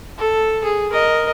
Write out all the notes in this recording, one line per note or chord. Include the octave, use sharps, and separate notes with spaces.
A4
G#4
A#4 D#5